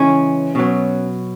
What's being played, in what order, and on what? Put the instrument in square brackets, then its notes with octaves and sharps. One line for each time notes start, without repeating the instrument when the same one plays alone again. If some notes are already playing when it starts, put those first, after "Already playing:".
Already playing: [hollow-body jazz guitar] C#3 E3 G#3 C#4
B2 F#3